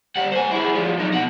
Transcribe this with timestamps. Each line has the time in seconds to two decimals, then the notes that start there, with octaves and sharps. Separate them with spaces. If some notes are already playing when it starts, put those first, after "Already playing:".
0.16 G3 F#5
0.32 C5 G#5
0.52 E4 G#4
0.75 F3 G3
0.98 F#3 D#4
1.14 B2 F#5